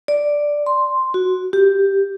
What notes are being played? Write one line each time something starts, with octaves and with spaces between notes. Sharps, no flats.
D5
C6
F#4
G4